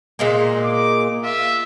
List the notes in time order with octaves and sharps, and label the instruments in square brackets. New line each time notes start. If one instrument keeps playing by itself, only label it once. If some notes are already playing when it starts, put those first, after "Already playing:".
[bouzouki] A#2 G#3 A#3
[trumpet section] D6
F4 E5